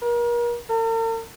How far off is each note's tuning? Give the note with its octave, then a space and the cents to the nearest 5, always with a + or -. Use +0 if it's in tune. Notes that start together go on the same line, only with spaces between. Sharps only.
A#4 +35
A#4 -45